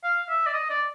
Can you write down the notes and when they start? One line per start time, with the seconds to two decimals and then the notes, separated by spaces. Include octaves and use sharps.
0.04 F5
0.29 E5
0.46 D5
0.54 D#5
0.70 D5